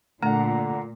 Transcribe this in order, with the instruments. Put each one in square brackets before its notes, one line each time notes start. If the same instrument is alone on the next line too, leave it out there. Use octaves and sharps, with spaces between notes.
[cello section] A#2 [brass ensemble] D3 [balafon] A3 [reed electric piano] F#5 A#5